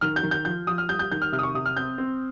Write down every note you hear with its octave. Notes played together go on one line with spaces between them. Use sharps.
D#3 F6
G6
D#3
G6
F3 G6
F3 D#6
F6
G3 G6
G6
D#3 G6
F6
C3 F6
D#6
C#6
C3 D#6
F6
C4 G6
C4